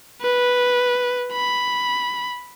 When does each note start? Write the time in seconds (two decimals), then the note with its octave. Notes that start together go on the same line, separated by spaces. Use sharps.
0.22 B4
1.32 B5